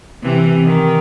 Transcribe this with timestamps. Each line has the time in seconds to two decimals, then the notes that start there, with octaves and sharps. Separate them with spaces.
0.23 C3 E3
0.63 D#3